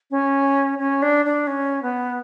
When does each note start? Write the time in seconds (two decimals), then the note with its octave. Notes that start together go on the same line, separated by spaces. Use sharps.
0.11 C#4
0.79 C#4
1.02 D4
1.26 D4
1.47 C#4
1.82 B3